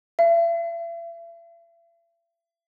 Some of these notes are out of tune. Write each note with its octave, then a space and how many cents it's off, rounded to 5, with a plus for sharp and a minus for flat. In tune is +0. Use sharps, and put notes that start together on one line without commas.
E5 +40